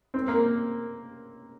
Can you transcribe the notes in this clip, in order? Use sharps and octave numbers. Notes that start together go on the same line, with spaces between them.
C4
A#3